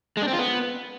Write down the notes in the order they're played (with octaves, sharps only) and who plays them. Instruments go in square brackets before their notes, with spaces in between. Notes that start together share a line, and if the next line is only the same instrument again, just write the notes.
[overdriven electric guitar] G#3
D4
C4
F4
B3